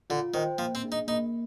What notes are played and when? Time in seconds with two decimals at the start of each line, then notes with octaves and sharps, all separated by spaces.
0.10 D3 F4
0.34 D#3 C5 G5
0.58 F3 A#3
0.75 C4
0.83 D4 G#4
0.92 D#4
1.07 A#3 D#4